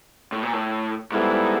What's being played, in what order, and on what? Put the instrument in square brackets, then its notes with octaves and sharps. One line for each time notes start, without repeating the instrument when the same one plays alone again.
[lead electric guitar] A2
A#2
A2
[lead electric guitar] G#2 [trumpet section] G3 B3 E4 A4